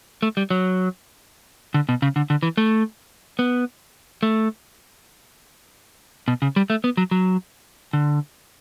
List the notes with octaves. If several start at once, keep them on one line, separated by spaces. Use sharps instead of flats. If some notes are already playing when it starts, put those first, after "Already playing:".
A3
G3
F#3
D3
B2
C#3
D3
D3
E3
A3
B3
A3
B2
C#3
G3
A3
B3
F#3
F#3
D3